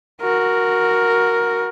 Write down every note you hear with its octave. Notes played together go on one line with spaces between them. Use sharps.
F#4 A#4